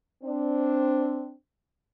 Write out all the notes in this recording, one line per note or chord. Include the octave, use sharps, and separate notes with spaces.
C4 D4